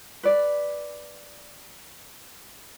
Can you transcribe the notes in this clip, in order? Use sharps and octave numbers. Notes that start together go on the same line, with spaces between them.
B4 D5